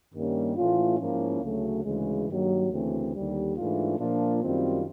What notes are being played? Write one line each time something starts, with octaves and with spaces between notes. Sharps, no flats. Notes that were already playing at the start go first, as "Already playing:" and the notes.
G2 D#3 G3 A#3 C#4
A2 E3 A3 C#4 F4
G#2 F3 A#3 C#4 E4
D2 C#3 F#3 A3
D2 C#3 E3 G#3
G2 D#3 F#3 A#3
D2 C#3 E3 A3 C4
D#2 D3 G3
G#2 E3 A3 D4 F4
A#2 F3 A#3 D4 F4
F#2 D#3 G3 C4 F4